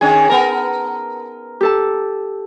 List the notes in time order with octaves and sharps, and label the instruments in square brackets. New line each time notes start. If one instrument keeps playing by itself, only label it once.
[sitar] D#3 C#4 G#4 [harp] G#5
[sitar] B3 A#4 [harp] A5
[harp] G4 A4 A5